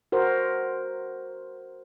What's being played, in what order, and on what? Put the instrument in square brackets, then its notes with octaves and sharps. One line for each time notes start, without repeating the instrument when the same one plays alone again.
[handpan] F#4 A#4 C5